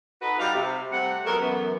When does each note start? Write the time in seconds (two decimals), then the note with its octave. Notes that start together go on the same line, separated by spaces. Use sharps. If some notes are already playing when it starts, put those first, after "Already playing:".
0.21 D#4 F#4 A4 B4
0.39 G3 D#4 F#4 F5
0.54 C3
0.92 C3 G3 A3 F#5
1.25 F#3 G#3 B3 F#4 A4 A#4
1.39 F#2 E3 B3